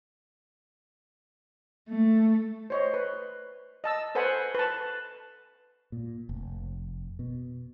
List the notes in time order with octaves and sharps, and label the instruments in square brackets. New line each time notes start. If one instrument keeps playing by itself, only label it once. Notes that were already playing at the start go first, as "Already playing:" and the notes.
[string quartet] A3
[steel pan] C5 C#5 D#5
B4
D#5 A5 E6
A4 B4 C5 F#5 G#5 B5
B4 A5
[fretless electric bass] A#2
F1
B2